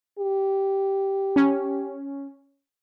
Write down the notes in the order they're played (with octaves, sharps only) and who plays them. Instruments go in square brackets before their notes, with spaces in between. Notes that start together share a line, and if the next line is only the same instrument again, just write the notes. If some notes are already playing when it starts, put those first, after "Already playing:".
[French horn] G4
[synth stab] C#4